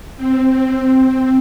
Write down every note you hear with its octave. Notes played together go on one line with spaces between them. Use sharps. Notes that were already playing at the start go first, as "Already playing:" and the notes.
C4